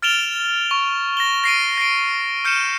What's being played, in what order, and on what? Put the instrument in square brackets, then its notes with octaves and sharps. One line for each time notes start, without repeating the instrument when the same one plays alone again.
[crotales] F6 A6 D7 E7 F7 G7
C#6
A#6 E7 G7
A#6 C7 D7 D#7
A#6 C7 D7
F6 G6 C#7 D#7 E7